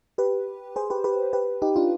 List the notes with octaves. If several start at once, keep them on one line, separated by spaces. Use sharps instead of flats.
G4 B4
G#4 C5
G4 B4
G4 B4
G4 B4
D#4 G4
D4 F4